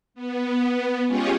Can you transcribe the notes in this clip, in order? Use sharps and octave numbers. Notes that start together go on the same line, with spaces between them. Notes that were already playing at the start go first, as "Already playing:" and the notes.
B3
G#3 C#4 F4 G4 G#4 C#5